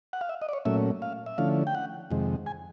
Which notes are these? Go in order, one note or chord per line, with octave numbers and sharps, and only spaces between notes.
F#5
F5
E5
D#5
D5
C#5
A#2 F#3 A3 C#4 E5
F5
E5
D3 F3 A3 C#4 E4 F5
G5
F#5
F2 C3 D#3 G#3
G#5